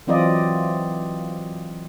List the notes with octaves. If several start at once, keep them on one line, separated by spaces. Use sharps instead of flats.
E3 F#3 C4 F4 D5 D#5